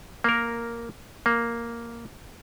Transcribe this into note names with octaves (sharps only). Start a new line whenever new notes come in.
A#3 A#4
A#3